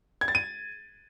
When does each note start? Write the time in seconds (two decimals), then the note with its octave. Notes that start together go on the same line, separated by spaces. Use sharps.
0.21 G#6
0.28 A6
0.35 D#7